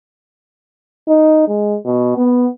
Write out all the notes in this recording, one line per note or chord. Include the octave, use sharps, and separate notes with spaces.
D#4
G#3
B2
B3